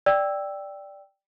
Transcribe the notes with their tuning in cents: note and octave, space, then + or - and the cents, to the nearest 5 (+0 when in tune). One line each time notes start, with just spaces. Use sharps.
D5 +0 G5 +0 E6 +0